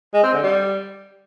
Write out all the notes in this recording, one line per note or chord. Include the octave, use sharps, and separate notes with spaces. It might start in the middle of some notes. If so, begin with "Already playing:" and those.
G#3
C4
D3
G3